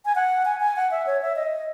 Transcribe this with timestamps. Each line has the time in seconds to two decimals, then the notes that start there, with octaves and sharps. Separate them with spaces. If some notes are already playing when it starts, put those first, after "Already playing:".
0.05 G#5
0.15 F#5
0.45 G#5
0.60 G#5
0.76 F#5
0.91 E5
1.07 C#5
1.21 E5
1.36 D#5